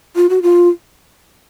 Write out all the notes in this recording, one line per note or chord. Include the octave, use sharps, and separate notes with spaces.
F4
F#4
F4